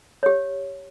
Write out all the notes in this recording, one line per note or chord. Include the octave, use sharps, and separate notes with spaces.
G4 C#5